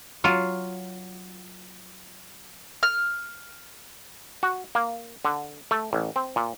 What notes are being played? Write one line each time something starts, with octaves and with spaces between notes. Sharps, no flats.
F#3 F4
F6
F#4
A#3
D3
A3
A1
C4
A#2